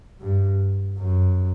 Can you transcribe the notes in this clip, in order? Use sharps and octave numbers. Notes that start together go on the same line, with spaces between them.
G2
F#2